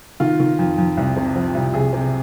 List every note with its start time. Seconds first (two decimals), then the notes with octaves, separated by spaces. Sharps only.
0.20 D#3 F4
0.40 D#3
0.59 F2
0.78 F2
0.97 C2
1.16 C3
1.36 F3
1.54 C2
1.74 C2 G#4
1.93 C3